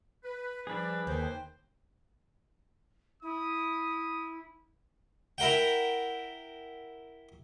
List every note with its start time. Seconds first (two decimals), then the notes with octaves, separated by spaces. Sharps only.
0.24 B4
0.67 F3 G3 D4 G#4 B4
1.07 D#2 C5 G5
3.22 E4 D#6
5.38 E4 A#4 F#5 G5